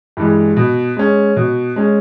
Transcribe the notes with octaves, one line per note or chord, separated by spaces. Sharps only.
G2 E3 G#3
B2
G#3 C#4
B2
G#3 C#4